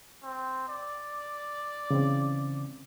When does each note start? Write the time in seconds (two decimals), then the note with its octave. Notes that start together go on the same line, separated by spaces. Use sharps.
0.23 C4
0.69 D5
1.91 C#3 E3 C4